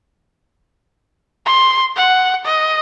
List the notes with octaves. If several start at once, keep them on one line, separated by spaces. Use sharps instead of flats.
C6
F#5
D#5